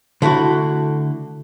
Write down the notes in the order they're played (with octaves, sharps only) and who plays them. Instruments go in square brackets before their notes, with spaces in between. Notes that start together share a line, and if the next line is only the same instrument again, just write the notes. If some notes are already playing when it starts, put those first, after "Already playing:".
[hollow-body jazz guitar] D3 A3 E4 F#4